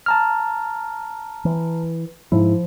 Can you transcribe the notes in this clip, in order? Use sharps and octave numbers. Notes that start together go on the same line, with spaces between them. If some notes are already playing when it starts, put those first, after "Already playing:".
A5 A#5 F6
E3
G#2 F3 E4